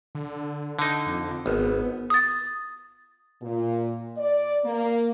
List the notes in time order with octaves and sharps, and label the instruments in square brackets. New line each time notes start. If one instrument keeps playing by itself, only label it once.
[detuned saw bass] D3
[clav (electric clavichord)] D3 D#4
[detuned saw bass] F2
[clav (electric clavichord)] G#1 [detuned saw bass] B3
[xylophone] D#6 A6
[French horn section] A#2
D5
A#3